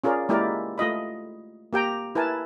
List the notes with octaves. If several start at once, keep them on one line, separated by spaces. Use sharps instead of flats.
C#4 F4 G#4 A#4 D5
G#3 A#3 E4 G4 A#4 D5
A3 F4 D#5 B5
A#3 G4 G5 A#5
E4 A#4 B4 G#5 A5